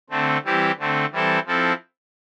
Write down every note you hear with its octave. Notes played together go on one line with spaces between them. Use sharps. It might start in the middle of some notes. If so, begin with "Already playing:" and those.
D3 A3 C4
E3 G3 C4 E4 G4
D3 A3 C4
E3 G3 C4 E4 A4
F3 C4 E4 A4